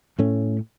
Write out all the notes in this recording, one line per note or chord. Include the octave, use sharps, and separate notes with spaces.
A2 A3 C#4